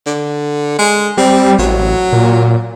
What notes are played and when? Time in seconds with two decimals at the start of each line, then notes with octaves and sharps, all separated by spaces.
0.06 D3
0.78 G#3
1.17 G3 C4
1.59 A1 F#3
2.13 A#2